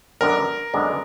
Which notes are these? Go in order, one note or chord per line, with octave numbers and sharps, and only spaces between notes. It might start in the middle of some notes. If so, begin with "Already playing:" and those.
F#2 D3 G#3 B3 D4 A#4
F#2 D3 G#3 B3 D4